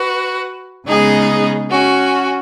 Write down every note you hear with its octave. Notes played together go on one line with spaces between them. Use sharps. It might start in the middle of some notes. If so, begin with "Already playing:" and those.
Already playing: F#4 B4
C#3 G#3 B3 D#4 G#4
C#4 F#4